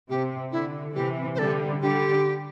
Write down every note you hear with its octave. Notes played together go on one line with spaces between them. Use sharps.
C3 G4
D3 E4
C3 E3 G4
C5
D3 G3 A4
D3 G3 G4